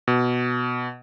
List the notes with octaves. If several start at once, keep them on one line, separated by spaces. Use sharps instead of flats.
B2